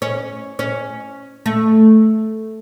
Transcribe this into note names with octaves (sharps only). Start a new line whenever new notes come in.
C#4
C#4
A3